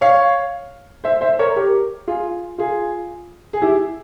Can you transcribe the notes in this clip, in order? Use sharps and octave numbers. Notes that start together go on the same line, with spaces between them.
C#5 F5
C5 E5
C5 E5
A#4 C#5
G4 A#4
F4 G#4
F4 G#4
G#4
E4 G4